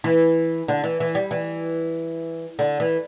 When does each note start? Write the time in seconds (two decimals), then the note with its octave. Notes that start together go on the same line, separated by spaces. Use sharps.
0.04 E3
0.68 D3
0.84 E3
1.00 E3
1.15 G3
1.31 E3
2.59 D3
2.80 E3